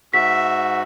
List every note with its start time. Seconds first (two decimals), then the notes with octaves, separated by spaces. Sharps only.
0.14 G#2 F#4 E5 B6